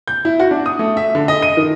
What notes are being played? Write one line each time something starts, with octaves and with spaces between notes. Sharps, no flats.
G6
E4
F#4
D4
D#6
A3
E5
D3
D#5
D#7
D#3